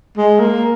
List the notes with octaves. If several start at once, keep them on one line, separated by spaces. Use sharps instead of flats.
G#3
A#3